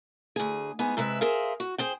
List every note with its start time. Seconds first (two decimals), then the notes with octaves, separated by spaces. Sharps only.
0.36 D2 G#4
0.79 G#2 B3 G#4 G#5
0.97 C3 G#3 B4 E5
1.21 G#4 A#4 C5 E5 F5
1.60 F#4
1.78 G#4 C5 G5